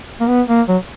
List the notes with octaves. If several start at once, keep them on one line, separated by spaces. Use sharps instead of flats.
A#3
B3
A#3
F#3